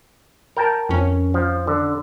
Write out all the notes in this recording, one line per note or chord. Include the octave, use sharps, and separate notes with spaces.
A#4 G5 A5
F2 C#4
F3
D3